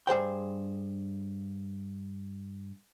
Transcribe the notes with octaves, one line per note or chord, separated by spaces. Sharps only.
G2 G#4 C5 G5